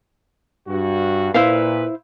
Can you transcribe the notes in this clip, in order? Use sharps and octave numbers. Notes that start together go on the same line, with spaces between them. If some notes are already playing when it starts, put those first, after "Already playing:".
G2 F#4
A#2 E4 B4 C5 F5